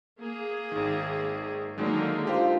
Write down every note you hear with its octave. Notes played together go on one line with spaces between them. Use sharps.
A#3 G#4
G#1 D#3
D3 D#3 F#3 G#3 A#3 D#4
D4 F4 G4 C5